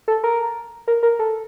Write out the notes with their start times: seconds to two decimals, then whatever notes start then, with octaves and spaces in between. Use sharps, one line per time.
0.08 A4
0.24 A#4
0.88 A#4
1.03 A#4
1.19 A4